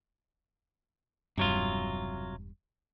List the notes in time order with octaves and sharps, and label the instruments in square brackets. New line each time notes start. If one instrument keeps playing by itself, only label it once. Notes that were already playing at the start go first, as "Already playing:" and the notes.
[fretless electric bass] E1 G2 [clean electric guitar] C3 F#3 F4